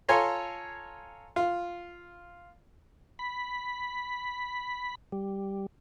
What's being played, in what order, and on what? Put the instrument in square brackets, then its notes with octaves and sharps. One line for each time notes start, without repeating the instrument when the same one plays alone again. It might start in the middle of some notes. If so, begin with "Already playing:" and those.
[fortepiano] F4 A4 C#5 G#5 A#5 C6
F4
[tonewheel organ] B5
G3